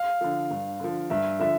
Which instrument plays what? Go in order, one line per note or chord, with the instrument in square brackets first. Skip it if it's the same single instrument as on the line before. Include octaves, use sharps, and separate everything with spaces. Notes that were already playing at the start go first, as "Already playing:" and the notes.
Already playing: [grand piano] F5
[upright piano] D3 F3
G2
D3 F3
[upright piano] G2 [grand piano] E5
[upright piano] D3 F3 [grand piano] E5